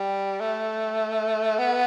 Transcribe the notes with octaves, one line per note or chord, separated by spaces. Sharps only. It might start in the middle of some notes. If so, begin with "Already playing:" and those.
Already playing: G3
A3
B3